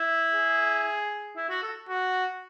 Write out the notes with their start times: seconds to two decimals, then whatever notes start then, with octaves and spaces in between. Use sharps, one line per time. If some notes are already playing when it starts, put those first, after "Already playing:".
Already playing: E4
0.32 G#4
1.36 E4
1.49 F#4
1.62 A4
1.89 F#4